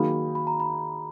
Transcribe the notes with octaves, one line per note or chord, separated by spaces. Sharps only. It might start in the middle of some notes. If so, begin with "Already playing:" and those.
Already playing: D#3 F#3 A#3 D#4 G#4 B5
B5
A#5
B5